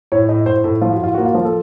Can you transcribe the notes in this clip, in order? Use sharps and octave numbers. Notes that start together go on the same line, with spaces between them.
A2 C#5
A2 D#5
A2 C5
A2 A4
F3 F4
F#4
A2 F4
A#3 F#4
F4
F3
A4